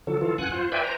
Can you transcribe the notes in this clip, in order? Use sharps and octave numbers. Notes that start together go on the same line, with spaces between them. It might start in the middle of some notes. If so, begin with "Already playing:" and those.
D3 F3 F#3 A4
E3 F4 A4
F#2 F#5 G#5 F#6
F4 C5
B4 C5 D5 E5 G5 G#5
C5 A#5